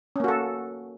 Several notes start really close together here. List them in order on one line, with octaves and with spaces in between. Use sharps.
C#4 A#3 F#4 A4